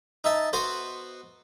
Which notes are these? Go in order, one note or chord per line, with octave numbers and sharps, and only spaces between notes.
D#4 E5 A5
B3 F#4 B4 C5